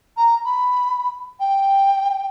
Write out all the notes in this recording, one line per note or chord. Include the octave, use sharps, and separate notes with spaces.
A#5
B5
G5